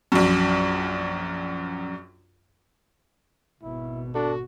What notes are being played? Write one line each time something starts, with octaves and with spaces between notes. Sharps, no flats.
A#1 F#2
G#1 B2 E4
D4 F#4 A4